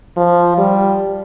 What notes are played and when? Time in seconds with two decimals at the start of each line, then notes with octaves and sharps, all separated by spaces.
0.17 F3
0.58 G3